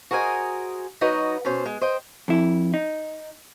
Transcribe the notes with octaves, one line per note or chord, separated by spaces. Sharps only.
F#4 G#4 A#4 C5 D#5 G#5
F#3 D#4 F#4 B4 D#5
B2 C#4 C5
G#3
C5 D#5 G5
F2 E4
D#4